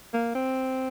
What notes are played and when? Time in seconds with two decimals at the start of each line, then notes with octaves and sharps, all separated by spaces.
0.14 A#3
0.35 C4